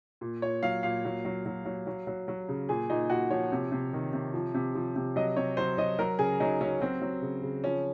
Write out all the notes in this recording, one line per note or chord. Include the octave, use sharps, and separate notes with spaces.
A#2
A#2 C#5
F#3 F5
A#2 F5
F#3
F#3
F#3
F#3
F#3
F#3
F#3
C#3
A#2 G#4
A#2 D#4
A#2 F#4
F3 C#5
C3
C3
D#3
C3
F3
C3
F3
C3
F#3 D#5
C3 C#5
F#3 C5
F#3 D#5
F#3 A#4
C#3 G#4
F#3 D#4
F#3 C#4
F#3 C4
F#3
C#3
C#3
F3 C#4